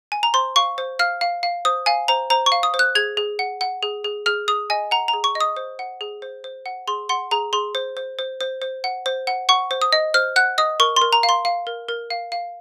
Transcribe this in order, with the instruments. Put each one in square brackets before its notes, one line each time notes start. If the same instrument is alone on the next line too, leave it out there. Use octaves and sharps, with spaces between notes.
[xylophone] G#5
A#5
C5 C6
F5 C#6
C5
F5 F6
F5
F5
C5 D#6
F5 G#5
C5 A#5
C5 A#5
C#6
F5
D#6
C5
F#6
G#4 G#6
G#4
F#5
F#5
G#4
G#4
G#4 F6
G#4 D#6
D#5 G#5
F#5 A#5
A#5
G#4
C#6
D#5
D#6
C5
F#5
G#4
C5
C5
F#5
G#4 C6
F#5 C6
G#4 A#5
G#4 C6
C5
C5
C5
C5
C5
F#5
C5
F#5
F#5 C#6
C5
D#6
D#5
C5 F6
F#5 F#6
D#5 D#6
A#4 C#6
C6
A#4
A#5
F5
C6
F5
A#4
A#4
F5
F5